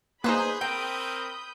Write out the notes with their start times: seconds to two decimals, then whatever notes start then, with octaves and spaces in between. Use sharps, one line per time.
0.24 A#3 D#4 G#4 B4 C5 B5 D#6 G6
0.61 C4 A#4 G5